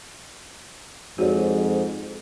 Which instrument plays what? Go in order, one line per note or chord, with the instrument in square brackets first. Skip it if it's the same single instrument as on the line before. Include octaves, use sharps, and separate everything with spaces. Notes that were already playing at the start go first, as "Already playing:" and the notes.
[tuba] F2 [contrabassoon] G#2 [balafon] F#4 C#5 D5